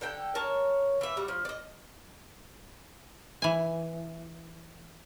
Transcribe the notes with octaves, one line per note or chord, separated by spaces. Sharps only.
D3 A4 G5
A#4 C#5 A5
E3 E5
G3 F#4
F3
D5 D#5
E3 G#5